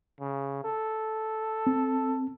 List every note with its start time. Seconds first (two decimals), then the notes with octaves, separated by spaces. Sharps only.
0.20 C#3
0.64 A4
1.67 C4